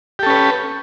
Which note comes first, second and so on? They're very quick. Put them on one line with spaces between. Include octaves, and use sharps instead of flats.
G4 A4 C#4 B4